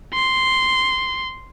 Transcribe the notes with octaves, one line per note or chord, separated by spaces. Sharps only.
C6